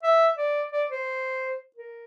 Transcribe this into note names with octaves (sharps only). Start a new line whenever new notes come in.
E5
D5
D5
C5
A#4